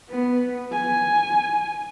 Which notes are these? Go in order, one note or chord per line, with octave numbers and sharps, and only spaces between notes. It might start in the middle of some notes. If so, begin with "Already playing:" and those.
B3
G#5